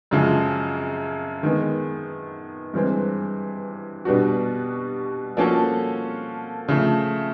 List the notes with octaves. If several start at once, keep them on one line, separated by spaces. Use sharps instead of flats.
F#2 C#3 F3 G#3
D#3 G#3 B3
G2 E3 G#3 C4
B2 G3 B3 D4 F#4
F3 A#3 C#4 F#4 A4
C#3 F3 A3